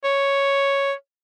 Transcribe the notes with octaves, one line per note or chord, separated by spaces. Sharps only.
C#5